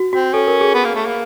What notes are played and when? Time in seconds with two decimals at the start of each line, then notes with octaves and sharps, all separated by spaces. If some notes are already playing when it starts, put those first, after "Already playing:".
Already playing: F#4
0.13 C4 F#4
0.33 C#4 A4
0.47 A#4
0.61 G#4
0.74 B3
0.85 A#3
0.95 A3
1.05 A#3